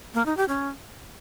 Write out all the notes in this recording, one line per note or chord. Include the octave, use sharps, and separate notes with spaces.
A#3
D#4
G4
C#4